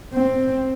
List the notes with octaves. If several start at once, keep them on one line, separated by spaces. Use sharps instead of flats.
C4